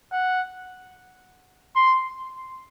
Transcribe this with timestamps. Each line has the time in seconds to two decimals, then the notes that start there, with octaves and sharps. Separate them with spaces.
0.12 F#5
1.75 C6